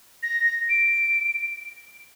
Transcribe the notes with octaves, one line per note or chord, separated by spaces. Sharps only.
A#6
D7